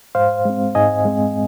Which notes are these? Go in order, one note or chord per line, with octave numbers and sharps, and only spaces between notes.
G#2 C5 F5
G#3 C4
G#2 D#5 G#5
G#3 C4